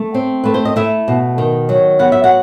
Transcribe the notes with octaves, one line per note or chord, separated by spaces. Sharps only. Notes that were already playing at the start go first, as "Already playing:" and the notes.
Already playing: A3
C4
A3 B4
C5
D#5
A3 E4 E5
B2
D#3
F#3
B3 F#5
E5
F#4 F#5